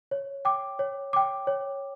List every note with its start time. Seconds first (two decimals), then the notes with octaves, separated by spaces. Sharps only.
0.11 C#5
0.45 G5 D6
0.79 C#5
1.13 G5 D6
1.47 C#5